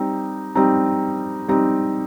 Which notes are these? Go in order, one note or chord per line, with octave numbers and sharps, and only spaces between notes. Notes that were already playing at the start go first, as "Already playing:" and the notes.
Already playing: G3 C4 D#4
G3 C4 D#4
G3 C4 D#4